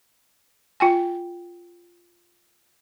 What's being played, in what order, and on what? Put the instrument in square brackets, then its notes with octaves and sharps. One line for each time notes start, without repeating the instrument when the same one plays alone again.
[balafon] F4 G5 G#5